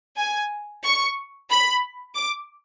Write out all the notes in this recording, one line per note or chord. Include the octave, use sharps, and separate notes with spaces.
G#5
C#6
B5
D6